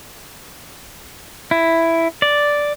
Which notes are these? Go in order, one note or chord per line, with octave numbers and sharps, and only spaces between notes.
E4
D5